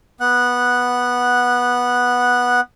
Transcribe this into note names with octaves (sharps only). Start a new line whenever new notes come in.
B3 F#5 F#6